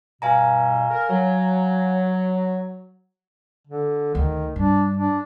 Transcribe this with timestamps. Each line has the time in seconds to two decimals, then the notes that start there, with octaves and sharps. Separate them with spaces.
0.22 G2 B2 F5 G#5 A#5
0.91 A#4
1.09 F#3
3.67 D3
4.15 D2 D#3
4.56 G2 D4
4.97 D4